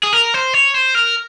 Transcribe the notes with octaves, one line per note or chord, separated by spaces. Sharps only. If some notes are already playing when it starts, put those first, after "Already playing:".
G#4
A#4
C5
C#5
C5
A#4